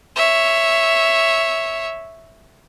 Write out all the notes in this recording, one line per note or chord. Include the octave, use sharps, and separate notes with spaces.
C#5 E5